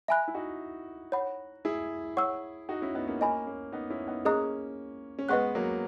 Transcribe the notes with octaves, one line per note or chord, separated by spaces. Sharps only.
E5 G#5 B5 F#6
E4
D#4 F#4
C#5 F#5 B5
E4 G#4
C#5 F#5 C#6 E6
D#4 F#4
C#4 E4
B3 D#4
A#3 C#4
A#3 C#4 D#5 G#5 B5
A#3 C#4
B3 D#4
C#4 E4
B3 D#4
A#3 C#4 G#4 D#5 A#5 D#6 F#6
C#4
G#3 B3 B4 D#5 F#5 C#6 F#6
F#3 A#3